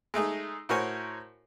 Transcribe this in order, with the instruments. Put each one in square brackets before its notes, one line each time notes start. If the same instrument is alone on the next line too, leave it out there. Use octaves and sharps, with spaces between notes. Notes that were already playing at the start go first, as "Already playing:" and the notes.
[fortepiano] G#3 A3 D#4 G#4
A2 F#4 A#4 C5 C#5 G#5